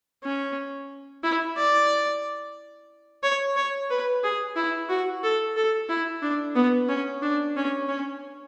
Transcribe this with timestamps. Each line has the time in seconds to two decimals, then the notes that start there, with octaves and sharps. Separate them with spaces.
0.24 C#4
1.23 E4
1.57 D5
3.23 C#5
3.56 C#5
3.90 B4
4.23 G#4
4.56 E4
4.89 F#4
5.23 A4
5.56 A4
5.89 E4
6.22 D4
6.55 B3
6.89 C#4
7.22 D4
7.56 C#4
7.88 C#4